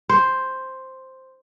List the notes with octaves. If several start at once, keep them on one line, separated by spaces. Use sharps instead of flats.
C5